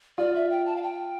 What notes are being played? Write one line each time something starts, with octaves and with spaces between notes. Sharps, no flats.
F4 D5
E5
G5
A5
F5
G5